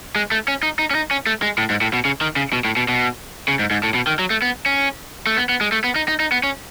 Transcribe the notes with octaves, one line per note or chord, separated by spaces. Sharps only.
G#3
A3
C#4
D#4
D#4
C#4
D#4
C#4
A3
G#3
A2
G#2
A2
B2
C#3
D#3
C#3
B2
A2
B2
B2
C#3
G#2
G#2
A2
B2
D#3
F#3
A3
B3
C#4
A3
B3
B3
G#3
A3
B3
D#4
D#4
D#4
B3
C#4